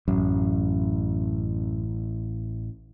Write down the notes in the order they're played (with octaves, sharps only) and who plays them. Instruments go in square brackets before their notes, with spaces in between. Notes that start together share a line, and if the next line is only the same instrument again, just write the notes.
[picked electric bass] A1 [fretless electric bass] F#2